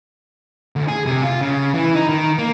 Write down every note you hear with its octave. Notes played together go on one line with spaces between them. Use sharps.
D2
G#4
C3
F4
C#3
E3
D#4
D#3
A#3